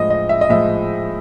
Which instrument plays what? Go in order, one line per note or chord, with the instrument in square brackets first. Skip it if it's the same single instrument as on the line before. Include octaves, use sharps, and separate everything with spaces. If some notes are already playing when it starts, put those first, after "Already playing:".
Already playing: [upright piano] A2 F3 G#3 D#5
D#5
E5
D#5
A2 F3 G#3 E5